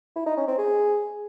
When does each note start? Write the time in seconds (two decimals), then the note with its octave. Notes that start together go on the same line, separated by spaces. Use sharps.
0.16 E4
0.26 D#4
0.37 C#4
0.47 C4
0.58 G#4